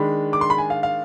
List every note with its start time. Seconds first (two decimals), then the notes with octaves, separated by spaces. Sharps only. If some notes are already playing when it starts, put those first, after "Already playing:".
Already playing: D#3 G#3 D4 B5
0.33 D6
0.41 C6
0.50 B5
0.58 G#5
0.70 F5
0.83 F5